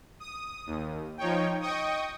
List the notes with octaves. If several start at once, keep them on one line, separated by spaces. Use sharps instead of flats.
D#6
D#2
F3 D#4 C#5 G5
D#5 G5 C#6 D#6